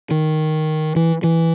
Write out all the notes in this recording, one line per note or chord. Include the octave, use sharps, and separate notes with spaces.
D#3
E3
E3